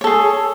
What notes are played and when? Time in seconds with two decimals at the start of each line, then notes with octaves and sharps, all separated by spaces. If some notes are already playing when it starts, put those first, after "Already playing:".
0.01 C#5
0.04 A4
0.07 G#4